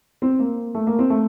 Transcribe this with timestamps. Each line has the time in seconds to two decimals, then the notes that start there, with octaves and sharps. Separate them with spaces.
0.22 C4
0.39 A#3
0.75 A3
0.87 A#3
0.99 C4
1.10 A3